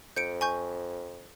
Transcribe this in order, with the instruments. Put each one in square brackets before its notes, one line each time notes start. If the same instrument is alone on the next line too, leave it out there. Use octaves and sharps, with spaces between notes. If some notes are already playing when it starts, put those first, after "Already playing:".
[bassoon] F2 [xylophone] G6 C#7 D7
[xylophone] G#5 C#6 G6